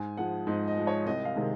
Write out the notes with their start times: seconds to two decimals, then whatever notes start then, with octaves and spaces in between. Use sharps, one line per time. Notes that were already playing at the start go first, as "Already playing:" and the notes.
Already playing: G#2 G#5
0.17 F3 G#3 F#5
0.47 G#2 D#5
0.68 D#5
0.77 F3 G#3
0.87 C#5
1.06 C2 D#5
1.25 F5
1.36 C3 D#3 G#3